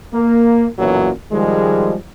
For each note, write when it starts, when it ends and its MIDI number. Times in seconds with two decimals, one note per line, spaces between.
0.14 0.66 58
0.79 1.11 35
0.79 1.11 42
0.79 1.11 46
0.79 1.11 52
0.79 1.11 54
1.32 1.94 51
1.32 1.94 53
1.32 1.94 55
1.32 1.94 56